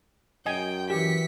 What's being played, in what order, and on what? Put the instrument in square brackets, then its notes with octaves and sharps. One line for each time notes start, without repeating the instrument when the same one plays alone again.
[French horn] F#2 [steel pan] D#5 G#5 [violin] G5
[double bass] E3 [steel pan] G4 [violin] B6 C#7